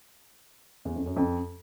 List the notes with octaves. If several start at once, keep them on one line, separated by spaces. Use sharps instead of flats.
E2
F2
F#2
F2